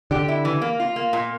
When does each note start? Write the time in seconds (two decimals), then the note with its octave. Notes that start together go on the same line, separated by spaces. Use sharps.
0.11 D3 G4
0.28 E4
0.45 E3
0.62 A#3
0.80 F4
0.96 A#3
1.13 A#2